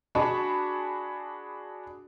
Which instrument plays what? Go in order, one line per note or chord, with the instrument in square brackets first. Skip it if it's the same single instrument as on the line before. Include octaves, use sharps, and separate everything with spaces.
[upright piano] D4 F#4 G#4 A5 B5 C#6